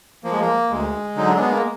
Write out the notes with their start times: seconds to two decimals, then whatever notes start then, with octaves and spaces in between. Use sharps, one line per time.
0.24 F3 A#3
0.32 G#3
0.40 A#3
0.70 D2 G#3
1.16 D3 F#3 D#4
1.29 D4
1.39 B3
1.51 A#3